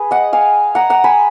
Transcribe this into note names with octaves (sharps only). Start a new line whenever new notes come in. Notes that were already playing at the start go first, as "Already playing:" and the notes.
Already playing: G#4 B4
D#5 F#5
F5 G#5
F#5 A#5
F#5 A#5
G#5 B5